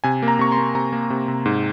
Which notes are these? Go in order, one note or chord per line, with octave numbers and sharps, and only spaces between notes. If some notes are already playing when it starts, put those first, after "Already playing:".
C3 G#5
A#3
A#5
C3 C#6
C6
A#3
C3 A#5
A#3
C3
C3
G#2